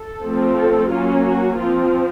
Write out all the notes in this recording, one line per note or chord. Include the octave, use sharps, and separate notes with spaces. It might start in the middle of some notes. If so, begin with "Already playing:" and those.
Already playing: A4
F3 A3 C4
A4
F#3 A#3 C#4 F4
F#4
F3 C4 F4